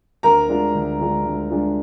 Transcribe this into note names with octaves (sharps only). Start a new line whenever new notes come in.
D2 A#4 A#5
D3 G#3 D4 F4
D2
D3 G#3 D4 F4
D2
D3 G#3 D4 F4